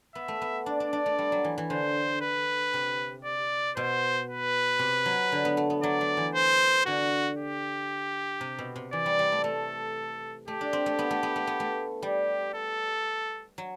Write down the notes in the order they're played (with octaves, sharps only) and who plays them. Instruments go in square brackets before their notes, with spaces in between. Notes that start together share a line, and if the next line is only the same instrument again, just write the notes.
[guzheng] B3 [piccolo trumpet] E5
[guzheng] A3
B3
[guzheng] D4 [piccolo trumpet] D5
[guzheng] D4
D4
A3
G3
F#3
E3
E3
[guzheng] D3 [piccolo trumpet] C5
[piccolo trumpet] B4
[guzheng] C3
[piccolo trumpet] D5
[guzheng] B2 [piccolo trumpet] C5
[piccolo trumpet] B4
[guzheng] C3
F#3
D3
B3
A3
B3
[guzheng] F#3 [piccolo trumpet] D5
[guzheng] F#3
E3
[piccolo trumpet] C5
[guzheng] D3 [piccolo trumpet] F#4
[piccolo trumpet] G4
[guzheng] C3
B2
C3
[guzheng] E3 [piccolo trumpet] D5
[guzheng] G3
G3
A3
[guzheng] A3 [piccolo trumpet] A4
[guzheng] A3 [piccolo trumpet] G4
[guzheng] D4
C4
A3
B3
A3
B3
A3
B3
A3
[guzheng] G3 [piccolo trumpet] G4
[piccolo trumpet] A4
[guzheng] F#3